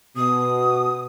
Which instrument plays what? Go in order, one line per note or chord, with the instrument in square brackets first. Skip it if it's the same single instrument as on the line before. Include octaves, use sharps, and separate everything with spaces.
[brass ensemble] B2 [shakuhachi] D#6